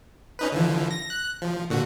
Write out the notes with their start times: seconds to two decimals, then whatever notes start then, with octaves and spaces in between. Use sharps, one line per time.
0.39 C#4 D#4 B4
0.52 D3 E3 F3
0.91 A#6
1.10 F#6
1.42 F3
1.70 A#2 D3 F#4